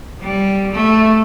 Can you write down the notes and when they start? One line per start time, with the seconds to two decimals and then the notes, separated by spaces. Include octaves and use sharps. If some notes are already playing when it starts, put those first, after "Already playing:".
0.21 G3
0.72 A3